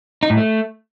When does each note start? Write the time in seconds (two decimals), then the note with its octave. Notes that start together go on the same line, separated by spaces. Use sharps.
0.23 D#4
0.30 A2
0.37 A3